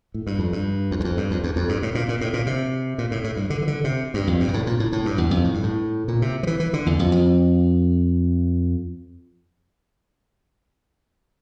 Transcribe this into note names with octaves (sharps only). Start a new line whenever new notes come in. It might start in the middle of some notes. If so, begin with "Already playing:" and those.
A2
G2
F2
G2
F2
E2
F2
G2
F2
E2
F2
G2
A2
A#2
A#2
A2
A#2
C3
A#2
A2
A2
G2
D3
E3
D3
C3
G2
F2
G2
A#2
A2
A#2
A2
A2
G2
E2
F2
A2
G2
A2
A#2
C3
F3
E3
E3
D3
E2
F2
F2